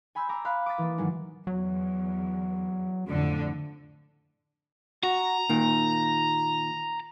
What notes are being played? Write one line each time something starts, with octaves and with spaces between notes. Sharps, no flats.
G#5 B5 C6 E6 G6
A#5 D6 E6
F5 B5 C6 F#6
D6 D#6 A6 B6
E3 A#3
G#2 D#3 F#3 G#3 A#3 D#4
E2 F#3
F2 A2 D3
F#4 A#5
A#2 D#3